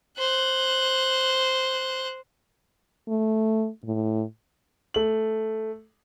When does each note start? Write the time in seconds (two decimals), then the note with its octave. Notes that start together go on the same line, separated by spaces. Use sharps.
0.18 C5 F#6
3.08 A3
3.84 A2
4.94 A3 F#7